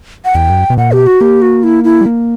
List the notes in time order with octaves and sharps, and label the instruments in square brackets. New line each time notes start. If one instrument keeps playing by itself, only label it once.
[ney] F#5
[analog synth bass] E2 [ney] G5
[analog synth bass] F#2
B2
[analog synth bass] A#2 [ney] F#5
[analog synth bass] B2 [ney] G4
[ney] F#4
[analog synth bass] A#3 [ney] G4
[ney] F#4
E4
E4
[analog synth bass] G3
A#3